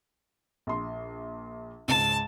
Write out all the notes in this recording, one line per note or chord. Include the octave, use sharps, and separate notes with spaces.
A#1 C6
C#2 G#2 A5